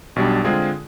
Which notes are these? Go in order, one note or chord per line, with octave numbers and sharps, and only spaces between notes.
B1 B2 G3 D4
D3 G#3 C4 F4 G#4